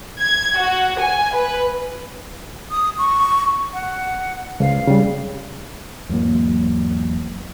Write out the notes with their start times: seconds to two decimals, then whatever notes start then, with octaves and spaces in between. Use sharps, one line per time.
0.21 G#6
0.58 F#4
1.00 G#5
1.36 B4
2.71 D#6
2.98 C#6
3.73 F#5
4.60 C#2 F5
4.87 C#3 G3
6.09 E2 G#2 F#3 A#3